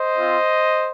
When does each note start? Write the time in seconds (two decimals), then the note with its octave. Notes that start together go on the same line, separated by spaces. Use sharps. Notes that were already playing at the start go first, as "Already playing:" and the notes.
Already playing: C5 D#5
0.17 C4 F4